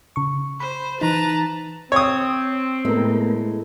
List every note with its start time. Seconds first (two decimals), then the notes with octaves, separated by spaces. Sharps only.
0.16 C#3 C#6
0.60 C5 B5
1.01 E3 D#4 B4 A5 A#5
1.92 C4 C#5 D#6
2.85 A2 G#3 A3 B3 A#4